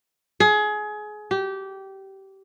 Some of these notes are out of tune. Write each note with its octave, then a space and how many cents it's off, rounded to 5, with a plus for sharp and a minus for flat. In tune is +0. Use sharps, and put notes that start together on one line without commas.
G#4 +25
G4 -20